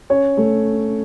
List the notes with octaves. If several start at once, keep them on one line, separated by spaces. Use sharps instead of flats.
C#4 C#5
A3